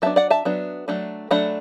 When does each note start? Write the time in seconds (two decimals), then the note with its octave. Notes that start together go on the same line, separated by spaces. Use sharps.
0.02 F#3 B3 D4 E5 A5
0.16 D5 F#5
0.30 E5 A5
0.45 F#3 B3 D4
0.88 F#3 A3 D4
1.31 F#3 A3 D4 F#5 B5